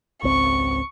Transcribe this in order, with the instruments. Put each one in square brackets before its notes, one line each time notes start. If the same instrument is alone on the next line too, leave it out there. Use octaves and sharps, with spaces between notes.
[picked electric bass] G#1 C#2 C4 [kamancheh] C#6